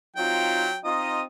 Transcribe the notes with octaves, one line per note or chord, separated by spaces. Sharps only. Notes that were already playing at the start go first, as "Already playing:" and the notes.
F#3 C4 D#4 F4 G5
C4 D#4 F4 D#5 D#6